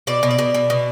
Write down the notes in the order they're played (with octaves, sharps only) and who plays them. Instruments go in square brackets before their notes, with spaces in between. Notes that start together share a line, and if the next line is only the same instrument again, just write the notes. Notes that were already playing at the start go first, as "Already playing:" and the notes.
[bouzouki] B2 D5
B2
D5
B2
B2
B2